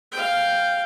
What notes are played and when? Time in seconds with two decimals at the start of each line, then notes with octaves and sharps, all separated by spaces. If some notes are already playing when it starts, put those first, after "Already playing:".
0.12 F5 G5